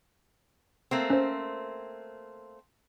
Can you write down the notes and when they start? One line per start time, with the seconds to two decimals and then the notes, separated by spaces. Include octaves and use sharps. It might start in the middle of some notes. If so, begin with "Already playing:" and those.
0.91 A3 A#3 C4
1.10 C#4 C5